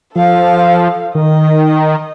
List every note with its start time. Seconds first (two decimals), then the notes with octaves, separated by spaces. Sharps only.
0.16 F3 A4 F5
1.15 D#3 D#5